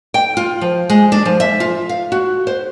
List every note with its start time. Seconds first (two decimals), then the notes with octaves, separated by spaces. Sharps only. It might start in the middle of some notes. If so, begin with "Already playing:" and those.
0.14 G5
0.37 F4
0.61 F3
0.90 G#3
1.12 D4
1.25 F3
1.40 E5
1.60 F4
1.89 F5
2.12 F#4
2.47 C5